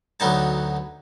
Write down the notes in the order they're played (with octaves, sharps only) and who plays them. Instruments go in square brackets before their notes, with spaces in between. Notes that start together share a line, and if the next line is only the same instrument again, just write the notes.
[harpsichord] D2 F#3 B3 D#4 A5